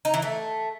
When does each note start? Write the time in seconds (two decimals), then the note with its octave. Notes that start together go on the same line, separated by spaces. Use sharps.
0.05 D#4
0.14 E3
0.22 A3